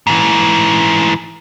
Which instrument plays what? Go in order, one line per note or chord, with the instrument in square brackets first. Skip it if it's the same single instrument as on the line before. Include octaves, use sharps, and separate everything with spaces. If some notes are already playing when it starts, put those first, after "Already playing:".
[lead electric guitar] G#2 E3